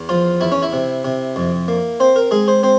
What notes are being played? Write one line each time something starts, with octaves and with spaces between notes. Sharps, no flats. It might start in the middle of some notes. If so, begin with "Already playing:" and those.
Already playing: E2
F3 F4
E2 E4
C#4
E4
C3
C3
F2
A#3
C4 C5
A#4
G#3 G#4
C5
C4 C5